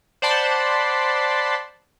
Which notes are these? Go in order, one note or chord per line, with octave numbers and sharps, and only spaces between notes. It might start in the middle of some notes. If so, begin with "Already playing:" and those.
C5 D5 F#5 A5 B5 C6